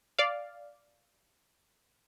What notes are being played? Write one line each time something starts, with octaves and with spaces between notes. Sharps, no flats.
D5 F5